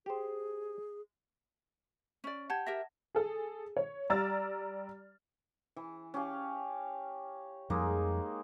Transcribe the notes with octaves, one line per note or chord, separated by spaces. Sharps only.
G4 G#4 C5
C#4 D5
G4 F#5 A5 G#6
G4 A#4 E5 A#6
G#4 A4
C#5
G3 D5 A#5 E6 F6 A6
E3
C#4 G4 F5
F2 F3 G3 G#3 A#3 D#4